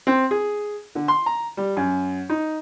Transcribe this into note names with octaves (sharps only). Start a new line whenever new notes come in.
C4
G#4
D3
C6
A#5
G3
F#2
D#4